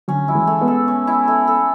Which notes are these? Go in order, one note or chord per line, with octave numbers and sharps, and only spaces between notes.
D3 F#3 C#4
F#3 E4
E3 G#3
A3
G#3 B3
A4
C#4
E4
A3
A4